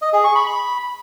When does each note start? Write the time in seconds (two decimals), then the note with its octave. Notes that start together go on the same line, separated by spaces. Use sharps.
0.02 D#5
0.13 G#4
0.24 C#6
0.35 B5
0.47 B5